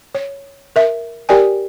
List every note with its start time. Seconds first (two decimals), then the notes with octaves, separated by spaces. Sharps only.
0.15 C#5
0.76 A#4 E5
1.29 G4 A#4 D5 G5 G#5